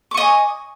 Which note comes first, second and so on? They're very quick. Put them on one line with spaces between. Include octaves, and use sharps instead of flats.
D6 C#6 D#5 G#5